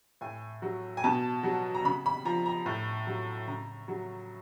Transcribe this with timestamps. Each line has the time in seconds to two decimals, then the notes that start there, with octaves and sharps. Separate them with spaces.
0.21 A2 G#5
0.62 F#3
0.97 G#5
1.04 B2 A5
1.43 F#3
1.74 A#5
1.84 C#3 B5
2.06 B5
2.25 F3 A#5
2.46 A#5
2.66 A2
3.07 F#3
3.47 C#3 A#5
3.88 F#3